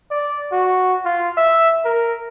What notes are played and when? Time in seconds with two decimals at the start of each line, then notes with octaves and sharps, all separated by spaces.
0.11 D5
0.52 F#4
1.05 F4
1.37 E5
1.85 A#4